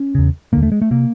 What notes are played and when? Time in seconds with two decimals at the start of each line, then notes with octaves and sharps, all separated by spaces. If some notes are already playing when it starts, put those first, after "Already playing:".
Already playing: C#4
0.15 E2 C#3
0.53 D#2 D3 A#3
0.63 A3
0.72 G#3
0.82 A3
0.91 C3 A#3